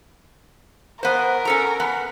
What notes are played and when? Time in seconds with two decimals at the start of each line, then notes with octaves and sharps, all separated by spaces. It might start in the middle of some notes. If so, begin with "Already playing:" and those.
1.03 B3 A#4 C5
1.45 C#4 A4 A#5
1.80 B3